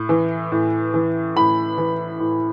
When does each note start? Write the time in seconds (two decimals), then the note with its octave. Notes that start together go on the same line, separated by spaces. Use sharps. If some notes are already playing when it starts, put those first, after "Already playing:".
Already playing: A2
0.09 E3
0.52 A2
0.94 E3
1.36 A2 B5
1.78 E3
2.20 A2